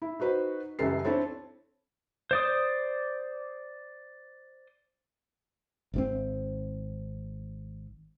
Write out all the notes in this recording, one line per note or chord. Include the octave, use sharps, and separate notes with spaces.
E4
D#4 F#4 B4 C5
C#2 F#2 E3 G3 A4 C7
C4 D4 E4 A4 C#5
C5 D5 D#6
G#1 D3 C4